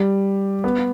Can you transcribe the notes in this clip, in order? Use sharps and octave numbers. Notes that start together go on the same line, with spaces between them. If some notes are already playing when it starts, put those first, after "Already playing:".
Already playing: G3
B3